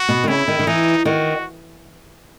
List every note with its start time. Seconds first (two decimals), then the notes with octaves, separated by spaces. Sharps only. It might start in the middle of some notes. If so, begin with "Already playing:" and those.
Already playing: F#4
0.09 B2
0.24 D#3
0.28 C#3 E4
0.48 D#3
0.59 D#3
0.67 E3 D#4
1.05 D#3 F#4